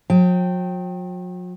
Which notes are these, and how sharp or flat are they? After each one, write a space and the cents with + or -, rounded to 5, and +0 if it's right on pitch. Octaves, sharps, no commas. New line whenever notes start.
F#3 -45 G5 -10